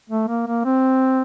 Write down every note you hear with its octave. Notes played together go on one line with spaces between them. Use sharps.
A3
A#3
A#3
C4